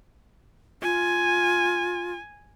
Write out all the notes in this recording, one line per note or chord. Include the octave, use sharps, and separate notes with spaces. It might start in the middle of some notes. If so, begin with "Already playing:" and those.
F4 G#5